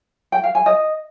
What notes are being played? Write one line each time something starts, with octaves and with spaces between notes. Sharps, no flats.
G5
F5
G#5
D#5